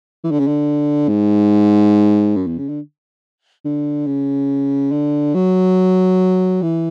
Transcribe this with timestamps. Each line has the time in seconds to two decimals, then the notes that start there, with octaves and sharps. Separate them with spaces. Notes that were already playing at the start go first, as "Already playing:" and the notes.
0.24 E3
0.31 D3
0.39 C#3
0.47 D3
1.08 G#2
2.36 F#2
2.47 E2
2.58 C#3
2.69 D3
3.65 D3
4.07 C#3
4.92 D3
5.35 F#3
6.62 E3